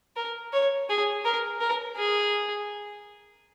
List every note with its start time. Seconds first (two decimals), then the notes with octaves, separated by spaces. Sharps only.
0.16 A#4
0.53 C#5
0.89 G#4
1.25 A#4
1.60 A#4
1.96 G#4